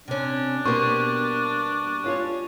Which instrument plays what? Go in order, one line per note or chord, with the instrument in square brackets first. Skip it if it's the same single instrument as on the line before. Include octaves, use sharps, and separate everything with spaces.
[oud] C3 C#4 [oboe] D4
[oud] B2 G3 [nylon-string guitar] A#3 C5 [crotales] C#6
[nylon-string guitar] C#4 F4 C#5